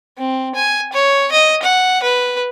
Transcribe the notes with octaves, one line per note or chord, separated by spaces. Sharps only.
C4
G#5
C#5
D#5
F#5
B4